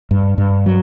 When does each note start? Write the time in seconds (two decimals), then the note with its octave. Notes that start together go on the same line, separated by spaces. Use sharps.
0.11 G2
0.38 G2
0.66 F#3